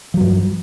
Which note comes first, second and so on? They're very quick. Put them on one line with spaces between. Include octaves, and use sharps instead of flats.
F3 F#3 G2